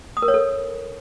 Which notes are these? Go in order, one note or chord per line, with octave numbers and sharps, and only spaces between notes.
D#6
A#4
C#5
A4